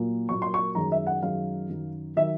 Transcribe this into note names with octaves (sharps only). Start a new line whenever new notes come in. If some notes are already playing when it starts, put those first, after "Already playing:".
Already playing: A#2 F#3 A#3
A#2 F#3 A#3 C#6
C6
C#6
F#2 D#3 G#3 A#5
E5
F#5
F#2 D#3 G#3 F5
F#2 D#3 F#3
D#3 F#3 E5